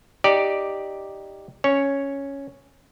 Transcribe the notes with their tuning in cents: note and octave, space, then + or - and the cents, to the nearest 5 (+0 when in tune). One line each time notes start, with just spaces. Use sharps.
D#4 +5 G4 +0 D5 +0
C#4 +0 C#5 +0